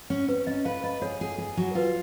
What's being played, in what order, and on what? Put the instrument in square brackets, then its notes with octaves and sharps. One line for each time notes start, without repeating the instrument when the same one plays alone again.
[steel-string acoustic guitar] C#4
[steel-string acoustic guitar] C#4 [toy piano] B4
[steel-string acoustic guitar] C#4 [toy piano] D#5
[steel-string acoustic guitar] B4 [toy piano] F5
[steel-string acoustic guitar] B4 [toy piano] D#5
[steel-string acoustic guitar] G#4 [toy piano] C#5
[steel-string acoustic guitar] G#4
G#4
F#3
[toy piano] A#4
[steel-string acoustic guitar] F4 [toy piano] B4